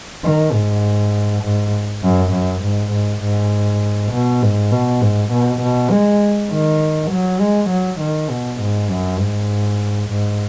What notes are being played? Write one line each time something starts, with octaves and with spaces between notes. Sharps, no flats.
D#3
G#2
G#2
F#2
F#2
G#2
G#2
G#2
B2
G#2
B2
G#2
B2
B2
G#3
D#3
F#3
G#3
F#3
D#3
B2
G#2
F#2
G#2
G#2